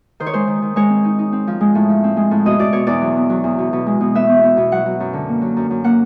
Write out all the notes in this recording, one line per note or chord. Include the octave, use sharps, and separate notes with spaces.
D#3 C5
C#5
G#3 C5
D#3
D#3
G#3 C#5
C4
D#4
D#4
C4
F3
G#3
A2
F3
C4
G#3
A2
B2 D#5
B2 D5
B2 C#5
E2 D5
F#3
B3
F#3
E2
B2
B2
G#3
B2
B3 E5
B3
B3
B2
F#3 F#5
F#3
F#2
D3
A#3
F#3
F#2
F#2
A#3 F#5